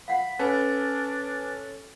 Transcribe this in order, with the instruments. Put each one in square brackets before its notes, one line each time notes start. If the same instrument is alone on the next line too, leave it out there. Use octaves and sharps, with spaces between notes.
[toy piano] F5 F#5 [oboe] B5
[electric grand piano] C#4 A4 [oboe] D4 [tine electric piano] B4 G#5